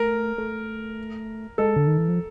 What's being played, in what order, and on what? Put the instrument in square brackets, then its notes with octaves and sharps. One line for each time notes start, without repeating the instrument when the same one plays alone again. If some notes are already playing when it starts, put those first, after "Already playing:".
Already playing: [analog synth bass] A3 [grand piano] A#4
[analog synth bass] A3
[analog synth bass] G#3 [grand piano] A4
[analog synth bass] D3
D#3
E3
F3